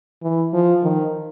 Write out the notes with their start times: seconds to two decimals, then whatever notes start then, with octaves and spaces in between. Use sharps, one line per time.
0.23 E3
0.53 F3
0.83 D#3